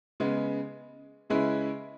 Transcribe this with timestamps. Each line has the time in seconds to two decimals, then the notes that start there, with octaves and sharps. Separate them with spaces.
0.20 C#3 G#3 B3
1.30 C#3 G#3 C#4 E4 B4